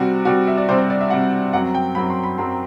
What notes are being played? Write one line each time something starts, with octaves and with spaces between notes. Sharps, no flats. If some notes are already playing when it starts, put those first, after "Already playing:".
Already playing: C3 G3 C4 F#4
C3 G3 C4 F#4
E5
D5
C3 G3 C4 C5
C5
D5
E5
C3 G3 C4 F#5
F#2 F#3 C4 F#5
G5
F#2 F#3 C4 B5
C6
B5
F#2 F#3 C4 C6